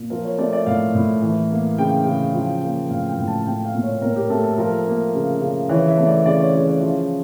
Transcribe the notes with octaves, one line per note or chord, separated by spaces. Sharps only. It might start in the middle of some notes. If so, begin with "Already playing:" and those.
Already playing: A#2
F3 A#4
C#5
A3 D5
D5
A2 F5
A2
E3
A#3
C#3 G5
C#3
F3
A#3
A2 F5
G5
A2
A5
A3 G5
F5
A#2
C#5
A#2 A#4
G4
A3 A4
A4
F3 A#4
A#3
C#3
C#3
E3 C#5
E5
A3
D5
C#3 D5
C#5
C#3
C#5
F3